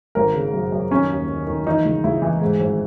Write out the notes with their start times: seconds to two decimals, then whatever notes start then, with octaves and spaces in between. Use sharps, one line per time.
0.15 G#1 A#4
0.34 C#3
0.54 F#2
0.72 F#2
0.91 D#3 C#4
1.09 D#2
1.28 D#3
1.47 D#3
1.66 E3 D#4
1.85 C#2
2.04 C#2 E4
2.22 E3
2.41 G#2
2.60 G#1